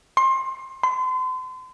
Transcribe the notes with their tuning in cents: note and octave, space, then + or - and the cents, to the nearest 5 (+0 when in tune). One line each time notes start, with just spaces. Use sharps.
C6 +25
C6 -40